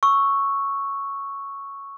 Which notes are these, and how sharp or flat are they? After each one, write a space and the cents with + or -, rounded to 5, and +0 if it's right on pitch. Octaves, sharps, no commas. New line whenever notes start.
C#6 +0 E6 +0